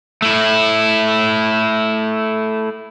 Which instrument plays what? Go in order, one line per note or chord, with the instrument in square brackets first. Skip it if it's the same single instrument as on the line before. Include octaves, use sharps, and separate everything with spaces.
[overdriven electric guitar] A3 E4